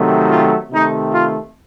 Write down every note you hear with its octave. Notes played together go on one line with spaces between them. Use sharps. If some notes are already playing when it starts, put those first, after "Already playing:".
Already playing: C3 D#3 F#3 A3
F4
C3 D#3 A3 D#4
F4